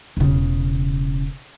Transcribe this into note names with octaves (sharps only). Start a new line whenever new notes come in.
E1 C#3